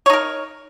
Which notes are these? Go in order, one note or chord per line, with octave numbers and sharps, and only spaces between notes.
D#4 A#4 C#5